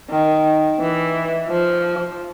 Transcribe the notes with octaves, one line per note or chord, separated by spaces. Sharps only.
D#3
E3
F3